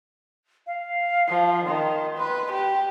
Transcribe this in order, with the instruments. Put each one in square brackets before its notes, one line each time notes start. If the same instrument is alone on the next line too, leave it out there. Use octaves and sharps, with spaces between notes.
[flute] F5
[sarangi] F3
[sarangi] D#3 [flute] C6
[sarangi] B4
G4